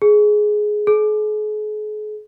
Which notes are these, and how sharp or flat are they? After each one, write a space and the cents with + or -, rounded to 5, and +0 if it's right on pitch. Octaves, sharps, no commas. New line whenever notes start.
G#4 +15
G#4 +40